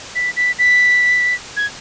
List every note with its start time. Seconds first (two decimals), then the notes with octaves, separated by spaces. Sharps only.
0.15 B6
0.37 B6
0.59 B6
1.57 G#6